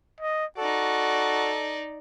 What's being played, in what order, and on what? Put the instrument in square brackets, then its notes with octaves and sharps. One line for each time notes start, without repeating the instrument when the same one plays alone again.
[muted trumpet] D#5
[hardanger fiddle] D#4 D5 [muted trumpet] F#4 [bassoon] A4